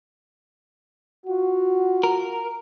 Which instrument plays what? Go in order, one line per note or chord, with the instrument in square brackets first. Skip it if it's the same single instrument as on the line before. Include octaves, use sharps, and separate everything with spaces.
[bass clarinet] F4 [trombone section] F#4
[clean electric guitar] A#4